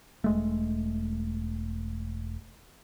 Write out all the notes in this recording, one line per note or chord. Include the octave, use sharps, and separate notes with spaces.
E1 G#3 A3